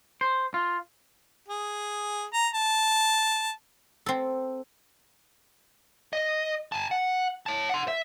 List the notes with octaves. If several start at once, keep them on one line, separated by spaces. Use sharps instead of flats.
C5
F4
G#4
A#5
A5
C4 A4
D#5
G#5 A5
F#5
C#5 A5
F#5 C6
E5